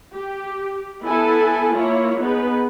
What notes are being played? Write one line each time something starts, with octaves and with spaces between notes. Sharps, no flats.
G4
B3 E4 A4 G#5 A5
A#3 E4 F4 C#5
B3 D#4 G#4 B4